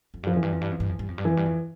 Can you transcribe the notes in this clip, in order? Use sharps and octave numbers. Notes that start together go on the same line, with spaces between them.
F2
G2 F3
F2 E3
G2
F2
G2
F2
G2
F2
G2
F2
G2
F2 E3
G2
F2